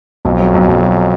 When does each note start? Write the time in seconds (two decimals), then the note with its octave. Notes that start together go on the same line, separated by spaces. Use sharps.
0.25 B1 F2
0.40 F#3
0.54 B1
0.68 B1
0.82 F#3